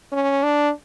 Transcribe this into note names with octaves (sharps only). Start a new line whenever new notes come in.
C#4
D4